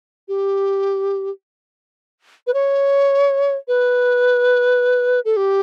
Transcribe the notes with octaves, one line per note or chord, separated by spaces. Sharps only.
G4
B4
C#5
B4
A4
G4